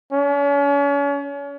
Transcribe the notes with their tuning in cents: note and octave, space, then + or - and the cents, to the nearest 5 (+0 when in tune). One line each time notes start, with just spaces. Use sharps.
C#4 +40